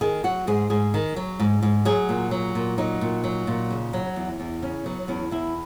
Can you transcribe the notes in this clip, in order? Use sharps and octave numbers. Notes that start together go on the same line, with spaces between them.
D#3 G#4
F#3 F#4
G#2 G#4
G#2 G#4
D#3
F#3
G#2
G#2
F#3 G#4
A#2
F#3
A#2
F#3 D#4
A#2
F#3
A#2
C#3
F#3
E2
E2
C#3 C#4
F#3 B3
E2 C#4
E2 E4